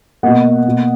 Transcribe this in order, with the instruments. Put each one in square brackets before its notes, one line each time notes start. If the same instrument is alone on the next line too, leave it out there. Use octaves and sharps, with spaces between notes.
[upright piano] B2 A#3 D#5 F#5
B2 A#3